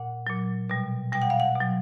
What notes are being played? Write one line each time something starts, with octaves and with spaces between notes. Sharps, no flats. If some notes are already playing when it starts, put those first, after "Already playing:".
Already playing: A#2 F#5
A#2 F#3
B2 G3
B2 G3 G5
F#5
F5
F#5
B2
F#3